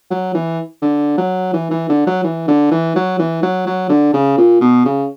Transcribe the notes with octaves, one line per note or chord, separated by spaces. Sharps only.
F#3
E3
D3
F#3
E3
E3
D3
F#3
E3
D3
E3
F#3
E3
F#3
F#3
D3
C#3
A#2
B2
C#3